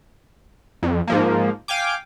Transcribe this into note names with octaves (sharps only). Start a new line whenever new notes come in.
F2
G#2 F3 A#3
F5 G5 G#5 D6